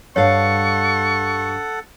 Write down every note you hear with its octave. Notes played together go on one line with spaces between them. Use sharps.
G2 A4 C#5 F5 F#5 C#6